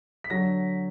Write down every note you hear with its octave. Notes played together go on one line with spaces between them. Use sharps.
B6
D3 F#3 A#6